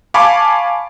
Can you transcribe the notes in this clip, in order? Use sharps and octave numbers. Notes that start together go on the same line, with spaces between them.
F5 G#5 A5 B5 C#6 D6